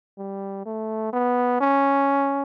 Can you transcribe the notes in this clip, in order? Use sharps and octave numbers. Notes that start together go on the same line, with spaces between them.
G3
A3
B3
C#4